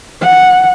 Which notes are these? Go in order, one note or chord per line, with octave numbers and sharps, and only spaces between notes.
F#5